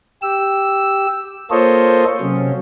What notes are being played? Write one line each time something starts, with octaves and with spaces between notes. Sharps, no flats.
G4 E6
A#3 F4 A4 C5 C#5 D#5
C3 F#3 C#4